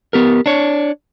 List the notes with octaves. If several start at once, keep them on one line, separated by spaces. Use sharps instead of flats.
B3 G4 A#4
D4 C#5